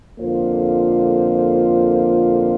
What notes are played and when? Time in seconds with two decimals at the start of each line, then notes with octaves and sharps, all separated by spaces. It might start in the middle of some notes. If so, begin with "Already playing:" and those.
0.19 F2 D3 A#3 F4 C5